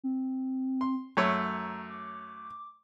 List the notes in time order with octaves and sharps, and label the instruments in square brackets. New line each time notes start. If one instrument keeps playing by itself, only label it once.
[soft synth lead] C4
[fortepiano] C6
[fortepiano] F#2 A3 C#5 [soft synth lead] A#5
[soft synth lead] D6